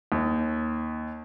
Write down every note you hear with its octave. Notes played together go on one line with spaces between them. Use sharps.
D#2